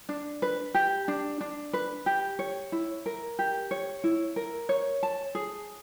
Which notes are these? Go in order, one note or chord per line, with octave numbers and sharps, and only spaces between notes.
D4
B4
G4
D4
D4
B4
G4
C#5
E4
A#4
G4
C#5
E4
A#4
C#5
A5
G#4